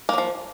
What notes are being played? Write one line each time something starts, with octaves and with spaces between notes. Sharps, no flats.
F3 F#3 A#3